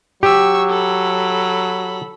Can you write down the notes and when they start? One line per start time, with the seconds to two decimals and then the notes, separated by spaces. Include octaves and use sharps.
0.23 F#3 G4 C#6 E6
0.70 A4 B5